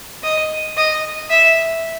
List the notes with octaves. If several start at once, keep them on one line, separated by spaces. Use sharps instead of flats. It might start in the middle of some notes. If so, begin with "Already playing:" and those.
D#5
D#5
E5